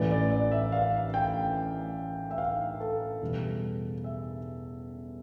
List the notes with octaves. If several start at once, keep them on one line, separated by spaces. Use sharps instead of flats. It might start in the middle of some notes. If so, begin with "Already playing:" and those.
Already playing: A1 A2 E3 D5
D5
D5
E5
F5
G5
E5
F5
A4
E2 B2 G3
E5